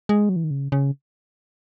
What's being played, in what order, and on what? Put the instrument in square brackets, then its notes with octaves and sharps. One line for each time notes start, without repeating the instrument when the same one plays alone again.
[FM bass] G#3
F#3
E3
D#3
C#3
C#3